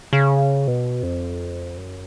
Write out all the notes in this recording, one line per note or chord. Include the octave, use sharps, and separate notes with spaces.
C#3
B2
F2
F#2